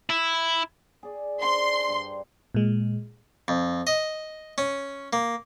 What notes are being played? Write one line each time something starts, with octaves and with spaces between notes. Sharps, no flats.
E4
G#4 D5
D4 C5 C6
G2
A#2 G#3
F2
D#5
C#4
A#3